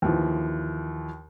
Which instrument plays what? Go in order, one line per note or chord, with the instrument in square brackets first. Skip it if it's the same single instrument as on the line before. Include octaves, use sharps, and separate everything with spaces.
[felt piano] D#2 E3 F3